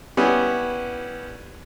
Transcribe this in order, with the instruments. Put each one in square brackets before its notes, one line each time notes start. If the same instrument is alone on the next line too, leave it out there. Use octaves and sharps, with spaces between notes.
[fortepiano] G3 B3 C#4 E4